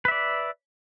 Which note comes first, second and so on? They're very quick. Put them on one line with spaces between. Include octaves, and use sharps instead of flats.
B4 E5 D5